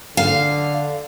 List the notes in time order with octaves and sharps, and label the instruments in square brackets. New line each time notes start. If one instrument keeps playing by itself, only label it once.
[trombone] D3 [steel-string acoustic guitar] F5